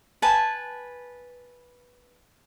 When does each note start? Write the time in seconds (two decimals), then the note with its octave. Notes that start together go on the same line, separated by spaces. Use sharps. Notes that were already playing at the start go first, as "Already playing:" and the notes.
0.22 B4 G#5 A5